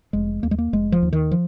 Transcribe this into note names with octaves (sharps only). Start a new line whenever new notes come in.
F1 G#3
D#2 A#3
G#3
A#3
F1 G#3
F3
D#2
D#3
F3